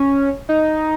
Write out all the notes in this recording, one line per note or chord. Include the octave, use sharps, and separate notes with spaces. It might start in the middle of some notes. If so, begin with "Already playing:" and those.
Already playing: C#4
D#4